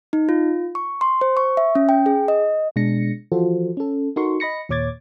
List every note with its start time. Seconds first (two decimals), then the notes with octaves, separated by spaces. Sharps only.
0.13 D#4
0.29 F4
0.75 C#6
1.01 C6
1.21 C5
1.37 C#6
1.57 E5
1.75 C#4
1.89 G5
2.06 G#4
2.28 D#5
2.76 B2 G#3 D4 A#6 C#7
3.32 E3 F3 F4 F#4 A4 C5
3.77 C#4 A4
4.16 D#4 F#4 A4 A#4 C6 C#6
4.40 D#5 B5 A#6 C#7
4.69 D#2 A#2 C#5 D6 G#6 A6